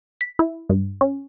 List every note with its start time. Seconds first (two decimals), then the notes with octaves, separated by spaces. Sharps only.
0.21 B6
0.39 E4
0.69 G2
1.01 C#4